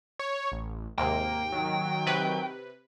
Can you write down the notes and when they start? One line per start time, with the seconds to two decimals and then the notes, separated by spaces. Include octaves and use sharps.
0.19 C#5
0.52 A1
0.98 D#2 G#2 C3 A#3 G5
1.52 D#3 F#3
2.06 C3 B4